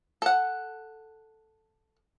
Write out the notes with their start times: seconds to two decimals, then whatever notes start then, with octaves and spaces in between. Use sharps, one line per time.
0.22 A4 F#5